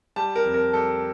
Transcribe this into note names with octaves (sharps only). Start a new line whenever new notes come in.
G3 A5
A#4
F2
A#4
G3 A4